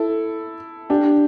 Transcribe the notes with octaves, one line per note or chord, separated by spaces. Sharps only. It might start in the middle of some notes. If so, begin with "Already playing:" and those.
Already playing: E4 A4
D4 G4